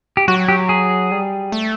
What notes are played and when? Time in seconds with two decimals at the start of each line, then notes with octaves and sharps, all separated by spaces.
0.17 G4
0.28 F#3 F#4
0.48 G4
0.69 G#4
1.11 G3
1.52 A3